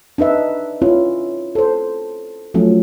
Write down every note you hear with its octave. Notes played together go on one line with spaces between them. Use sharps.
D4 D#4 B4 E5
C#4 E4 F4
A4 C5
F3 F#3 A3 C#4